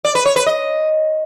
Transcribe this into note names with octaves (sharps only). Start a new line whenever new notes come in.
D5
B4
C#5
B4
D#5